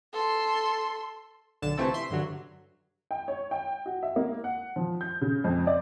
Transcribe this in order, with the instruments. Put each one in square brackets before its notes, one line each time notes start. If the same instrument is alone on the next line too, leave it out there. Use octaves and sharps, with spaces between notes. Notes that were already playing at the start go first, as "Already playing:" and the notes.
[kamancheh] A4 C6
[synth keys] B1 D3 A5 E7
C3 E3 F3 A3 C4 A4
E5 C6
G2 D3 F#3
[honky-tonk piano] G5
C#5
G5
F#4
E5
A#3
F#5
F3
G6
C#3
F2
D5